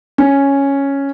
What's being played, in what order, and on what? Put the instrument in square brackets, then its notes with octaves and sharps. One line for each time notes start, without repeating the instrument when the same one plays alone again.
[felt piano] C#4